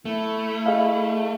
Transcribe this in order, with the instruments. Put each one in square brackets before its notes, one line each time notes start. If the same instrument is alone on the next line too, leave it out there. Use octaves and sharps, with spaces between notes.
[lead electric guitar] A3 [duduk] E4
[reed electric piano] G#4 D#5 F5